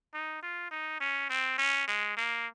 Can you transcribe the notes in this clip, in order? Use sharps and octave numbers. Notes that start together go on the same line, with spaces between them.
D#4
F4
D#4
C#4
C4
C#4
G#3
A#3